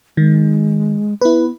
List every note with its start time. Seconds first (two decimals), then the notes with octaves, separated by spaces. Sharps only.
0.17 D#3 G#3
1.21 B3 E4 B4